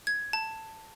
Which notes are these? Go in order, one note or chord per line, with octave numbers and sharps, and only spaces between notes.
G#6
A5